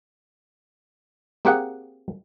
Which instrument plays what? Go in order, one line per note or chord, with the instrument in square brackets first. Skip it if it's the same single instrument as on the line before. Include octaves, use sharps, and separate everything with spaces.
[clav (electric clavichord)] A#3 C4 G4 G#4 F#5